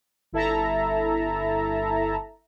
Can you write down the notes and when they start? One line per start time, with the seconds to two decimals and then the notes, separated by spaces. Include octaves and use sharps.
0.32 G1 E4 A4 E5 A5 A#5